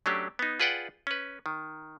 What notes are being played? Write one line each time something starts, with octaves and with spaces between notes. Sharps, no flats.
F#3 A3 C#4 D4 G4
B3 D#4
F4 G#4 B4 D5 F#5 G5
C#4 B4
D#3